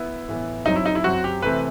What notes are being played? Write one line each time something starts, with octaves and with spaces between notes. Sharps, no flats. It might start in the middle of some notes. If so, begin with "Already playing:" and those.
Already playing: B3 E4
A2 E3 B3
F#2 F#3 C4 D#4
E4
D#4
E4
F#2 F#3 C4 F#4
G4
C3 E3 A3 C4 B4